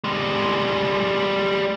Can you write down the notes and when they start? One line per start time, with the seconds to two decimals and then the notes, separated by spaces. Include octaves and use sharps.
0.04 G3 G#3